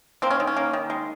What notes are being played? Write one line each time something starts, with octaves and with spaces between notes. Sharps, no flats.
A#3 C4
C#4
D#3
C#4
A#3
D#3
G#3